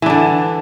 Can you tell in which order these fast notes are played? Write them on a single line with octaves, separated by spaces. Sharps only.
E3 D4 D3